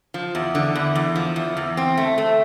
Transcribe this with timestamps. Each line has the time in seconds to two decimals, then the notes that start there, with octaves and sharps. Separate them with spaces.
0.14 F3
0.35 E2
0.55 D3
0.75 E2
0.95 E2
1.16 F3
1.36 E2
1.57 E2
1.77 C4
1.97 A3
2.18 A3